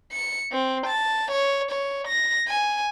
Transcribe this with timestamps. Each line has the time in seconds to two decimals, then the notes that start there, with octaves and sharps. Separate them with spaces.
0.12 C#7
0.52 C4
0.87 A5
1.31 C#5
1.71 C#5
2.08 A#6
2.48 G#5